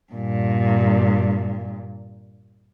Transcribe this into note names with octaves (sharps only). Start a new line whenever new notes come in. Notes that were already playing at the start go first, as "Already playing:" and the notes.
G2 A#2